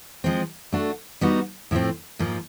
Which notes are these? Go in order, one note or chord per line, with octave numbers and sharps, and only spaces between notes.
F3 G#3 C4
A3 D4 F#4
G3 B3 D#4 F#4
A2 F3 A3 C4
G#2 F3 A#3